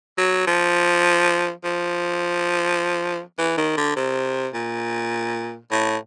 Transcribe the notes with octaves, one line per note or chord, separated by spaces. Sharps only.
F#3
F3
F3
E3
D#3
D3
C3
A#2
A2